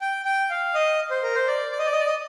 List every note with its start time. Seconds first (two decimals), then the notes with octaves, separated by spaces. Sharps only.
0.01 G5
0.25 G5
0.50 F5
0.74 D#5
1.11 C5
1.23 A#4
1.35 C5
1.48 D5
1.71 D5
1.79 D#5
1.86 D5
1.93 D#5
2.00 D5
2.07 D#5